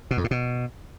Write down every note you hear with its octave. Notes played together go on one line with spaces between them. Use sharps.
B2
F2
A2
B2